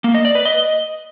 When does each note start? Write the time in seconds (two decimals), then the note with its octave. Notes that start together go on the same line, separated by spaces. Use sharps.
0.04 A#3
0.15 D#5
0.25 D5
0.35 B4
0.45 D#5